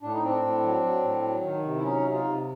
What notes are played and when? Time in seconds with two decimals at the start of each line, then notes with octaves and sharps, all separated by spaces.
0.02 A2 D4
0.13 D#4
0.22 A2 C4 D4
0.42 A2
0.63 F#3
0.82 F#3
1.03 A2
1.22 F#3
1.42 D#3
1.63 C3
1.76 E4
1.83 F#3 C#4 D#4
2.04 C3
2.12 D#4 F4
2.22 C3